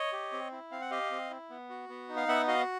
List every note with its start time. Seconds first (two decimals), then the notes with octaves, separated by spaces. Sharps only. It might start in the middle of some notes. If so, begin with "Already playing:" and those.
Already playing: C#5 D#5
0.13 G4
0.32 C4
0.52 E4
0.72 C4 F5
0.81 F#5
0.91 G4 D#5 F5
1.11 C4
1.30 E4
1.50 B3
1.70 F#4
1.89 B3
2.09 D#4
2.16 F5
2.28 B3 E5 F#5
2.47 F#4 D#5 F5